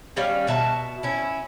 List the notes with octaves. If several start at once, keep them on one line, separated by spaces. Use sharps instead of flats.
D#3 G3 C#4 F5
B2 F#4 E5 A5
C#4 E4